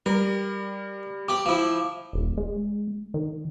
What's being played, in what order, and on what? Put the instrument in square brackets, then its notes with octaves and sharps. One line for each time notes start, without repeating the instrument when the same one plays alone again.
[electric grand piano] G3 [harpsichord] A#4
[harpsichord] G4 D5 [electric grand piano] D6
[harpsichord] F3 E4
[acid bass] D#1
G#3
D#3